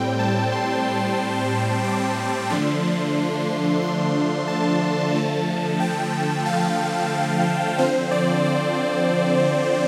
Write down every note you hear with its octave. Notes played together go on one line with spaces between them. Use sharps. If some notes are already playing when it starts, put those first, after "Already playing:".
Already playing: A2 G3 C4 G5
A5
C6
D6
D3 F3 A3 D4 C6
C6
A5
D3 F3 A3
G5
F5
D3 F3 C4 C5
D5
D5